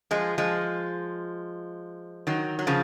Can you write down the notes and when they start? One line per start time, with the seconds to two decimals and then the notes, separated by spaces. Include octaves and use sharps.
0.11 F3 G#3
0.38 F3 G#3
2.27 D#3 F#3
2.59 F#3
2.67 C#3 F3